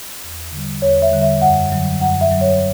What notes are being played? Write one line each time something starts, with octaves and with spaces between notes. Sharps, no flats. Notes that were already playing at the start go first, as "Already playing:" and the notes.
E2
D3 G3
E2 C#5
E5
D3 G3
E5
F#2 F#5
D3 F#3
F#2 F#5
E5
D3 F#3
C#5